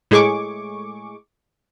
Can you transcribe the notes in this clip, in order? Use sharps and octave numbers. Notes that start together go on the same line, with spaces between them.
A2 G#3 G#4 C#6 D6